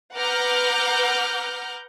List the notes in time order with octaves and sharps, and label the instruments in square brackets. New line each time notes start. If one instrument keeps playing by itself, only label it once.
[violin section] B4 F#5 A#5 D6 F6 G6